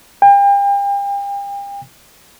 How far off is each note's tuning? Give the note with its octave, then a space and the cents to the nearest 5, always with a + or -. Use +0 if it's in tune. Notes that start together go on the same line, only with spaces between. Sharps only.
G5 +40